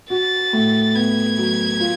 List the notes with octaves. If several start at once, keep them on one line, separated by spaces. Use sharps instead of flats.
F#4 A6
A2
B3 G#6
F#3
F4